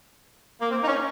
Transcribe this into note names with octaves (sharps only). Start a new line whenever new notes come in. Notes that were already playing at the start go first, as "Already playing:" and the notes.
A#3
C4
D#4
C#4